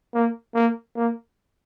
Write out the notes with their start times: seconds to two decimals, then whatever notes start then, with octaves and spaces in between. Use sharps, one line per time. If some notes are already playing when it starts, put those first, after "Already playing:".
0.14 A#3
0.54 A#3
0.96 A#3